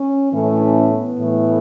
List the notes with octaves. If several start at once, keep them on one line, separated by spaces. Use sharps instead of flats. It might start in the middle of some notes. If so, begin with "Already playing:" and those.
Already playing: C#4
A2 E3 A3 C#4
C#4
B3
A2 E3 A3